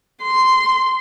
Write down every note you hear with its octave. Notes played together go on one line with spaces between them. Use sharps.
C6